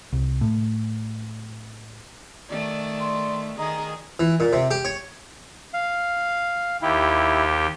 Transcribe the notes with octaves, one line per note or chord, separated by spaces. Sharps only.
C2
A2
D#3 A3 D5
C6
D#3 G#4 D#5 A#5
E3
A#2
C3
G4
C#5
F5
D#2 E4 G4